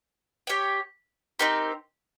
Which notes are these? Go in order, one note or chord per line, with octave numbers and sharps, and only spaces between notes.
G4 C#5 G5
C4 D#4 G4 A#4